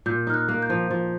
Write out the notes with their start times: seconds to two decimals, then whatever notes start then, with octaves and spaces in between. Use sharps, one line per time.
0.06 A#2 G6
0.27 D#4 F6
0.34 F#6
0.48 A#3
0.62 G6
0.70 F3
0.91 F3